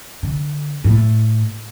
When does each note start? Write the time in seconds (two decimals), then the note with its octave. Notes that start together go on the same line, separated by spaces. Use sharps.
0.23 D3
0.84 A2